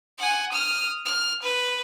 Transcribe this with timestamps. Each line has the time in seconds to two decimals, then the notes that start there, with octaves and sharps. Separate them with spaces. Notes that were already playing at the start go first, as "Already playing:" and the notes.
0.18 F#5 G#5
0.52 D#6 F6
1.05 F6
1.43 B4